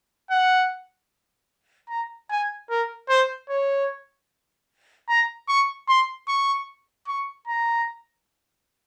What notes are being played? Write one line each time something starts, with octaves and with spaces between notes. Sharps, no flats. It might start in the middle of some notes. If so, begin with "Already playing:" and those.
F#5
A#5
G#5
A#4
C5
C#5
A#5
C#6
C6
C#6
C#6
A#5